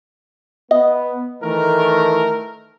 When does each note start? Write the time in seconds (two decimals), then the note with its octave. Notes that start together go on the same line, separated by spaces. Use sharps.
0.71 B3 D#5
1.42 D#3 E3 A3 A#4